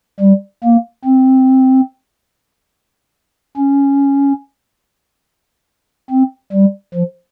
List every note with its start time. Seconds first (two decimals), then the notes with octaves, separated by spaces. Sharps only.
0.20 G3
0.63 A#3
1.05 C4
3.57 C#4
6.10 C4
6.53 G3
6.94 F3